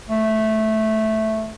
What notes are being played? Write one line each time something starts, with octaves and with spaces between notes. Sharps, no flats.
A3